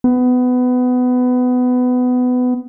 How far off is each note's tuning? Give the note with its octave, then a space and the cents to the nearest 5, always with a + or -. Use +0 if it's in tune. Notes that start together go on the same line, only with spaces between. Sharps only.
B3 +20